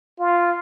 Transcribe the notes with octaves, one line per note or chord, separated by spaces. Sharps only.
F4